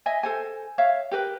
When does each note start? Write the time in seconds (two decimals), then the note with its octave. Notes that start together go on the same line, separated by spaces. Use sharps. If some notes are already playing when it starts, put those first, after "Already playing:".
0.06 D#5 E5 G#5
0.23 A4 C5 G#5
0.78 C#5 E5 F5
1.11 G4 A#4 B4 G5